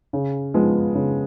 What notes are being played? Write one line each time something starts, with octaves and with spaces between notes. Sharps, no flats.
C#3
F3 G#3 B3
C#3